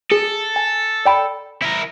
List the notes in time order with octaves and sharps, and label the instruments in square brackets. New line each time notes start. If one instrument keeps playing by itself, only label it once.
[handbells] G#4 [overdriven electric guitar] A4
[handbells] G#5
D5 G5 B5
[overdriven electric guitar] E4 A#4